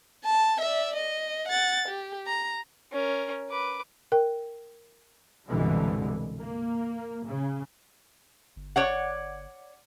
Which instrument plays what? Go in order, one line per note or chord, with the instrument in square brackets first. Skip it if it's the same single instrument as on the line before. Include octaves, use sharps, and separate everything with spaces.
[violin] A5
D5 E5
D#5
F#5 A6
G4
A#5
[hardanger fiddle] C#4 A#4
B4 D6
[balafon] A#4 G5
[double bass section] C2 G2 B2 D3 E3 G#3
A#3
C#3
[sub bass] G1
[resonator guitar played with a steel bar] C#5 D5 F#5